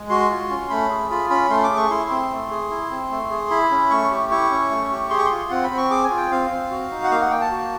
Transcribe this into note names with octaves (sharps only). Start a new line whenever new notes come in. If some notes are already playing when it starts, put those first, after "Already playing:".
Already playing: G#3
F#4 C6
F4
C#4
A3 B5
G#4
F4 B5
C#4 B5
A3 C6
D6
G#4
C#6
E4 C6
C4
A3
G#4
E4
C4
A3
G#4
E4 B5
C#4
A3 C#6
G4
E4 C#6
C#4
A3
G4
G#4 C6
C#6
F4 C6
C4 F#5
B5
C4
C#6
G#4 D6
G#5
F4
G5
C4 F5
C4
F#4
D#4
F#5
A#3 F5
F#5
A#3 G5
A5
F#4